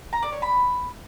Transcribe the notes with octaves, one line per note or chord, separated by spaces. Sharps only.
A#5
D5
C#5
B5